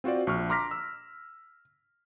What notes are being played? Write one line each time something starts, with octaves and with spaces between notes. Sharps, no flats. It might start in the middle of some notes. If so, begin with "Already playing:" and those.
C4 F4 F#4 C5 D5
A#1 C#6 F6
A#5 C6 D6 F6 A#6 B6
E6